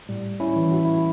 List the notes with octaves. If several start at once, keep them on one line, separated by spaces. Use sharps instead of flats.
A2 G3
C#4 E4
E3
F#4
E4